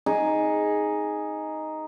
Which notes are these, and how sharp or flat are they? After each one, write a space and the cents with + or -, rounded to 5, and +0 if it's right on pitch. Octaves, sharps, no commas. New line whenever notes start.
D#4 +0 G#4 +0